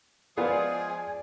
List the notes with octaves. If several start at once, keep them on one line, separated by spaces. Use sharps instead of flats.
F3 G#3 B3 F4 G#4 D5 G#5